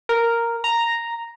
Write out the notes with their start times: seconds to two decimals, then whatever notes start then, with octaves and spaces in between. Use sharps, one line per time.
0.09 A#4
0.64 A#5